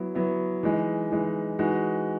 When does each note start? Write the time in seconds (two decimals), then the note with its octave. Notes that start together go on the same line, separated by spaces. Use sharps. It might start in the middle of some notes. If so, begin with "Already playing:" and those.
Already playing: F#3 B3 E4
0.15 F#3 B3 E4
0.63 E3 G#3 D#4
1.11 E3 G#3 D#4
1.59 E3 G#3 D#4 F#4